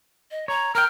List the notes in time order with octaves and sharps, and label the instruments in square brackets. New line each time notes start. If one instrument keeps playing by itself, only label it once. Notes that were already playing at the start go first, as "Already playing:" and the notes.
[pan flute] D#5
[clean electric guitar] C#5 [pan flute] A#5
[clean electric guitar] A#4 G5 [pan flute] F6